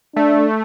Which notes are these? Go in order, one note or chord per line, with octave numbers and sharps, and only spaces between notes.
A3 D4